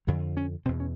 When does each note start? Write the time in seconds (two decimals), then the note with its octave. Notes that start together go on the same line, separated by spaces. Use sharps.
0.07 F2 D3 F#3
0.37 C#4
0.65 E2 B2 C4
0.80 C#4